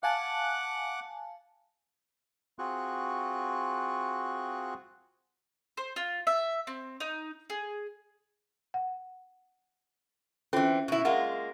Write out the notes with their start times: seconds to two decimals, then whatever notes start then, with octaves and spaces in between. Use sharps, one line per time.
0.03 F5 F#5 G#5 A5 D6 F#6
2.59 C4 F4 F#4 G#4 C#6 F#6
5.77 C5
5.96 F4
6.27 E5
6.67 C4
7.00 D#4
7.50 G#4
8.74 F#5
10.53 E3 C4 C#4 F4 A4
10.88 B2 E4
11.05 G#3 A#3 F4 F#5